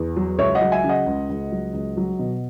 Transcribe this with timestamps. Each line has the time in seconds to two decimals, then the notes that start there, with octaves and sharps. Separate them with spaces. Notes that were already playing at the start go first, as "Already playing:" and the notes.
Already playing: E2
0.16 F#3
0.38 C#2 C#5 E5
0.55 D#5 F#5
0.61 F#3
0.72 E5 G#5
0.84 C#3
0.89 D#5 F#5
1.06 C#2
1.29 C#2
1.52 F#3
1.74 C#2
1.97 F#3
2.19 B2